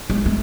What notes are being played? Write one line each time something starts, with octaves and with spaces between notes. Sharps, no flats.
G#3
A3